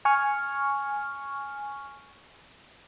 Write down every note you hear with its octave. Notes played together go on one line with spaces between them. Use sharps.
G#5 C#6 F6